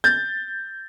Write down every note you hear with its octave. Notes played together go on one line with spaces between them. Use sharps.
G6 A6